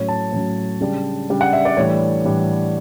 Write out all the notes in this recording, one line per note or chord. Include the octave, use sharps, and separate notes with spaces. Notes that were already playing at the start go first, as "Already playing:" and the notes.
Already playing: A2 F#3 C#4 C#5
A5
A2 F#3 C#4
C#3 G3 D4
C#3 G3 D4
F#5
E5
D5
A2 E3 G3 D4 C#5
A2 E3 G3 D4